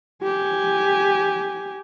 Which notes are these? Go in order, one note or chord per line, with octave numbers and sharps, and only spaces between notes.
G4 G#5